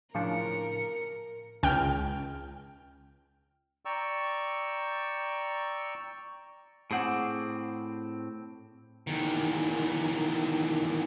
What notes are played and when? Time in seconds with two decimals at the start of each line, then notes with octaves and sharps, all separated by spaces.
0.15 A2 C#3 F3 D4 A#4 C#7
1.63 C#2 G5 F6
3.85 D5 G5 A#5 C#6 E6
6.91 A2 C4 G#4 F#5 D6
9.07 E2 D#3